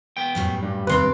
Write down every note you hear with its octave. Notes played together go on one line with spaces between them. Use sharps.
B3 G5
F#2 A2 G3
G2
D#2 C3 B4 D5 C6